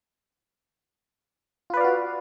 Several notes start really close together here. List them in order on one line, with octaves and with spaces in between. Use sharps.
F4 B4 D5 F5 F#4